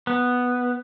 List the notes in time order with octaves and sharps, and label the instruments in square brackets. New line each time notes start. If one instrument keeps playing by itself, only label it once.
[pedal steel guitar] B3